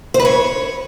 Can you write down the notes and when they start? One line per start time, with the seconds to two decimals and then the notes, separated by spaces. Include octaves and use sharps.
0.14 C5
0.20 B4
0.25 C#5